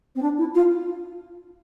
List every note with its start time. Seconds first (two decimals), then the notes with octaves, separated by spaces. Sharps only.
0.15 C4
0.22 D4
0.38 E4
0.55 F4